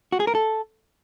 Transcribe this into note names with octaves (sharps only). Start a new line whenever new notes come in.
F#4
G#4
A#4
A4